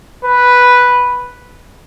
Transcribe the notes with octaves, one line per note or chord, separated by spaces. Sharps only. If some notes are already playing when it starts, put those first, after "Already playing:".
B4